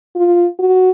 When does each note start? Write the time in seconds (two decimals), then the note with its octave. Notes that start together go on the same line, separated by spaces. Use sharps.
0.16 F4
0.59 F#4